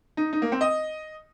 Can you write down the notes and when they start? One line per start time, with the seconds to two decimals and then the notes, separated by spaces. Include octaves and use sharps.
0.17 D#4
0.33 D#4
0.42 A#3
0.52 C4
0.61 D#5